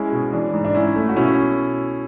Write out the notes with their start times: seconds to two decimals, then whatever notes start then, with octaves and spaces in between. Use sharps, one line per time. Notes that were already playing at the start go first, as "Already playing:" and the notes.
Already playing: G#3 C#4 E4
0.12 B2
0.33 E3 D4
0.54 G#2
0.65 D4
0.75 G#2 C#4 E4
0.95 A3
1.09 F#4
1.16 B2 C#4 E4